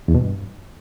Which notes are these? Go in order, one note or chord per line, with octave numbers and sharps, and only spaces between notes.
E2
B2
G2